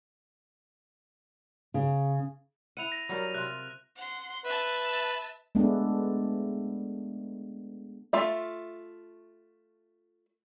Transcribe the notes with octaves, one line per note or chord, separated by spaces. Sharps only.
C#3
E4 F#5 D#7 F7
A#6
F#3 G3 A#4
C3 F4 F#6
F#5 C6
B4 E5 A5
G#3 A3 B3 D4
A3 F4 E5